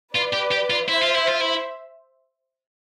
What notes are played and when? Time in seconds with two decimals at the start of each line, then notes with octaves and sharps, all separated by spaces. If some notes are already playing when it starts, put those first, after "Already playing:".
0.15 F4 B4 D5
0.34 G4
0.52 G4
0.71 F4
0.89 E4 C5 E5
1.02 F4
1.15 E4
1.27 F4
1.41 E4